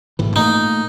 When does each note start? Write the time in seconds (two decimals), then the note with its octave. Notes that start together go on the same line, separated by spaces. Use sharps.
0.19 A1 G#2 E3
0.36 A#2 A3 A#3 D#4